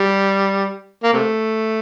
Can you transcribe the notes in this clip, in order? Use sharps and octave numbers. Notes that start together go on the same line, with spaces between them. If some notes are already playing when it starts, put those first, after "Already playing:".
Already playing: G3
A#3
C3 A3